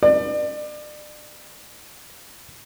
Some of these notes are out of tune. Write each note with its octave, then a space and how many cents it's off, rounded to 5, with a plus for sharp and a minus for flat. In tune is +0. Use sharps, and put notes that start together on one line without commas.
D5 +35